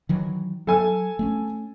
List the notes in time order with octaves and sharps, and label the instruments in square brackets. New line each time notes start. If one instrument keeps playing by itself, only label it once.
[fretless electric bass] D#3 E3 F#3
[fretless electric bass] F#3 [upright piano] A4 G#5 E6
[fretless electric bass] A3 B3 C#4